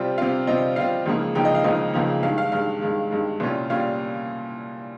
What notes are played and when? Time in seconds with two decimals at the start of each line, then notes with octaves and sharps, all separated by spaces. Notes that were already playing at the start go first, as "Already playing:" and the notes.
Already playing: C3 G3 C4 F4
0.18 C3 G3 C4 F4 F5
0.47 C3 G3 C4 F4 D#5
0.76 C3 G3 C4 F4 F5
1.06 C#2 C#3 F3 A#3 D#4
1.35 C#2 C#3 F3 A#3 D#4 G5
1.45 D#5
1.55 F5
1.64 C#2 C#3 F3 A#3 D#4 D#5
1.94 C#2 C#3 F3 A#3 D#4
2.23 G2 D#3 G#3 F5
2.38 F5
2.52 G2 D#3 G#3 F5
2.81 G2 D#3 G#3
3.11 G2 D#3 G#3
3.40 C2 A#2 G3 C#4 F4
3.70 A#2 G3 C#4 F4 F5